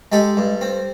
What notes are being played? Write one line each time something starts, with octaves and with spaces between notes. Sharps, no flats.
G#3 G4 A4
G2
C4